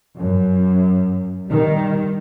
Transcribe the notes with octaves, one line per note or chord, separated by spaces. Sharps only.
F#2
D#3 G3